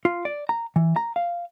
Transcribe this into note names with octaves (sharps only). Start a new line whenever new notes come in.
F4
D5
A#5
E3
A#5
F5